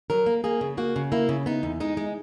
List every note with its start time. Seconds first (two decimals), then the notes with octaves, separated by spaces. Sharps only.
0.10 F#3 A#4
0.26 A#3
0.44 A#3 G#4
0.61 C#3
0.77 A#3 F#4
0.96 C#3
1.12 A#3 E4
1.29 C#3
1.46 B3 D#4
1.63 E2
1.80 G#3 D#4
1.97 G#3